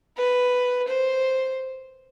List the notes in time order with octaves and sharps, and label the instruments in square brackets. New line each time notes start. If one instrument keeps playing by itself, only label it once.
[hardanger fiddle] B4
C5